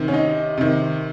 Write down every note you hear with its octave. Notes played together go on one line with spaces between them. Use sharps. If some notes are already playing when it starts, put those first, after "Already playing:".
Already playing: C3 D#3
C#4
D#4
C3 D#3